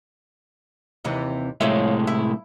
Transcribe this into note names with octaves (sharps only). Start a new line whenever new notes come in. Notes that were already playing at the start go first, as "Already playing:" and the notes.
D#2 C3 E3
C2 A2 F3 G#3 C#5 E5
E4